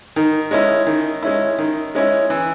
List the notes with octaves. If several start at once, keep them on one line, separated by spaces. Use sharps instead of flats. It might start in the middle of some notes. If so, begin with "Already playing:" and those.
D#3
G#3 C#4 E4
D#3
G#3 C#4 E4
D#3
G#3 C#4 E4
E3